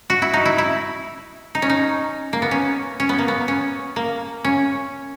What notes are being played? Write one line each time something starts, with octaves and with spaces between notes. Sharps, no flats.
F#4
E4
D#4
E4
E4
D#4
C#4
D#4
A#3
B3
C#4
C#4
B3
A#3
B3
C#4
A#3
C#4